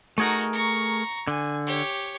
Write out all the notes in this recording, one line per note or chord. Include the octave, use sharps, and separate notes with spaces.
A3 D#4 F#4 G#4 A#4
A#5 C#6
D3 G#5
G4 C#5